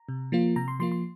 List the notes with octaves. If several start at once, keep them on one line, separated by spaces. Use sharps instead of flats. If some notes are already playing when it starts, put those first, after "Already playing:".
Already playing: A#5
C3
F3 A#3 F4
C3 A#5
C6
F3 A#3 F4 C6
C6